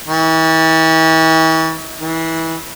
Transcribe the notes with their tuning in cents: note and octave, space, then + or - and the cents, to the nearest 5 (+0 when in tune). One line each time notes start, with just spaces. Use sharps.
E3 -40
E3 -25